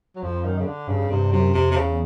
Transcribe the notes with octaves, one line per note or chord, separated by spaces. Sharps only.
F#3
F2 F3
F#2 D#3
C#3
D3
G2 C#3
G2 C3
F#2 C3
F2 C3
C3
E2 C#3